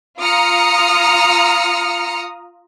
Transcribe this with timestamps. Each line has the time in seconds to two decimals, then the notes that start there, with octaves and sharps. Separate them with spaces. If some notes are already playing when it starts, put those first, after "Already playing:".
0.19 F4 A#5 D#6 F6 C#7